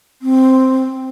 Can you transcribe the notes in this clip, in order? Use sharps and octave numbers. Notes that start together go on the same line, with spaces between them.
C4